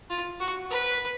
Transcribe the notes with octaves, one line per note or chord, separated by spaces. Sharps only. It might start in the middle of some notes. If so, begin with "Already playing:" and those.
F4
F#4
B4